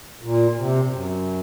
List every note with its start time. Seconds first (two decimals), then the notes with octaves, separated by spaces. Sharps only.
0.21 A#2
0.57 C3
0.91 F#2